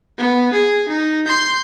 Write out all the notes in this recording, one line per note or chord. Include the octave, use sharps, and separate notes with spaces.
B3
G#4
D#4
C6 G6